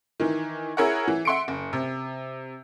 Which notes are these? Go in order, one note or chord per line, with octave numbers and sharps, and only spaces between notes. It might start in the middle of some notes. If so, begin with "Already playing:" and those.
D#3 E3
E4 G#4 A#4 C#5 F#5
E3
E5 F#5 C6 C#7 D7
F#1
C3